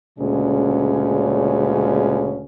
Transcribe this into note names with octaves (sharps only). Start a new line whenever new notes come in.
D2 A#2 C#3 G#3 C#4